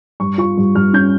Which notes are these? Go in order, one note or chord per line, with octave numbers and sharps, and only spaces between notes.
G2 C#6
F4 C#6
G2
G2 F6
C#4 G6